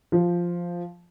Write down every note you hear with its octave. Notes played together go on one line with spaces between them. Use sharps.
F3